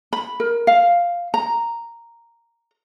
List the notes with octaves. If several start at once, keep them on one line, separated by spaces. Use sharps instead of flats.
B5
A#4
F5
A#5